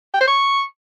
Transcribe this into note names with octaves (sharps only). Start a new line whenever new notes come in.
G5
C5
C#6